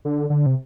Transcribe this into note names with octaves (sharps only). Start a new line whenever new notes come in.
D3
D3
C3